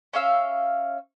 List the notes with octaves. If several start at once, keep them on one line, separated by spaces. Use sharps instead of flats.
C#4 E5 F5 E6